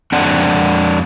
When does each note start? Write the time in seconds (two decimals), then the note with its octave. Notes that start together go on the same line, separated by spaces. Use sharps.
0.12 F2 C4 D4 F#5